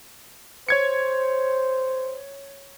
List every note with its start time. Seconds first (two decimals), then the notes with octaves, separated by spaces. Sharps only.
0.69 C5 C#5 G#6 C#7